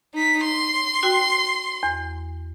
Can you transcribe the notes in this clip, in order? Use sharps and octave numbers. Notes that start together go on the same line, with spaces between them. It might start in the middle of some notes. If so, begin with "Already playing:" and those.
D#4 B6
C6
F#4 G5
E2